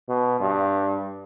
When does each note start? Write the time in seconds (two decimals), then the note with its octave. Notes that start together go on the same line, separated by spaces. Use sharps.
0.09 B2
0.40 G2